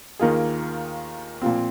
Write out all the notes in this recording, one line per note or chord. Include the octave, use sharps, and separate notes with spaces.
D#2 D#3 A#3 F4 G#4
A#2 F3 C4